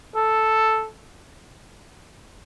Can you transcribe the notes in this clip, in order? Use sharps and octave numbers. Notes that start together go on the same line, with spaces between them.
A4